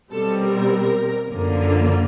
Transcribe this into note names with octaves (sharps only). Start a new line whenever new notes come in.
B2 G3 C4 A4
A#4
F#2 D3 F3 A#3